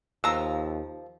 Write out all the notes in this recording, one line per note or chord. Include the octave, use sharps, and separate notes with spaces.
D#2 F3 A#5 E6